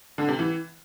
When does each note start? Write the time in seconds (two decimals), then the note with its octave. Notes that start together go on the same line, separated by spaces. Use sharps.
0.18 D3
0.28 C3
0.39 E3